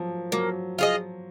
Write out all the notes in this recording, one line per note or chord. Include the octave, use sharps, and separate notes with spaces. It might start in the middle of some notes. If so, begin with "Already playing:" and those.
Already playing: F3 F#3
F#3 A#3
F4 G#4 D#5